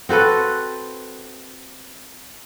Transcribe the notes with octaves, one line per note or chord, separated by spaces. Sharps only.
C4 F#4 A4 B4